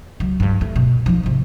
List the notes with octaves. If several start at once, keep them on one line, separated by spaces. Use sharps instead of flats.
C#2 F#3
G2 F#3
A3
B2
F3 D#4
G#2 C3